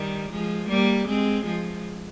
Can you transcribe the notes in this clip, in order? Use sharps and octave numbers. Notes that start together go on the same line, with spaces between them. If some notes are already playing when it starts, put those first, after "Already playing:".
Already playing: D#3 G3
F3 G#3
G3 A#3
G#3 C4
F3 G#3